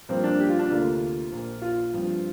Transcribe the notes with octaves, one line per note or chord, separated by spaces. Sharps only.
G2 F3 A#3 C4
D4
G4
F4
D4
D2 C3 A#3 F4
A#1 A#2 A#3
F4
G2 F3 C4